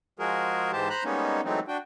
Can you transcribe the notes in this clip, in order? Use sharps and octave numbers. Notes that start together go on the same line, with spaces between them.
F3 G#3 F#4 G#4 A#4
G#2 E3 G#3 G4 C5 A5
C5 A#5 B5 F#6
G3 G#3 A#3 B3 C#4 D#4
E3 F#3 G#3 A3 C4 D#4
D4 F#4 G5